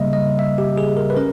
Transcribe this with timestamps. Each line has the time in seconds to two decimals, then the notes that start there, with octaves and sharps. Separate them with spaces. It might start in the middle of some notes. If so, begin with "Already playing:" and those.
Already playing: C#3 G3 A#3 D#5 E5
0.13 D#5
0.39 E5
0.58 G4
0.78 G#4
0.97 A#4
1.10 B4
1.16 C#4 A#4